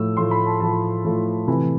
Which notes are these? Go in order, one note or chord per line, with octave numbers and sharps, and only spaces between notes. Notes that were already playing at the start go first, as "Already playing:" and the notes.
Already playing: A2 F3 A3 E6
A2 F3 A3 C6
B5
A5
A2 F3 A3 A5
A2 F3 A3
C3 E3 A3 B5